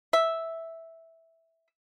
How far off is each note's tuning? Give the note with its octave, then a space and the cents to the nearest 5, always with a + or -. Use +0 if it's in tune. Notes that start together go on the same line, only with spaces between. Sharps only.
E5 -5